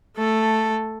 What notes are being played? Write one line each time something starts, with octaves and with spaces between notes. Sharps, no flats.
A3 A4